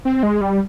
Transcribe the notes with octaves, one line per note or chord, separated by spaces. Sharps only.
C4
G#3
G3